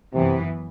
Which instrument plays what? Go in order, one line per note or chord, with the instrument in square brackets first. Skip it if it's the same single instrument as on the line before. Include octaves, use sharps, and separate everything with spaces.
[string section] F#2 E3 B3 [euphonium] C3